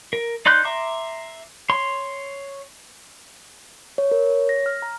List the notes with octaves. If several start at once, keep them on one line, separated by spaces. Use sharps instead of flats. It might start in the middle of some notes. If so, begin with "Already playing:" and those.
A#4
D#4 D5 C6 F#6 G6
E5 A#5 C6 D6
C#5 C6
C#5
A#4
C#5
A#6
F6
A#5